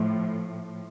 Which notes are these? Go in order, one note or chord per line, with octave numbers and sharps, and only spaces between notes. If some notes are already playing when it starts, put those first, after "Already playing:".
Already playing: A2 F3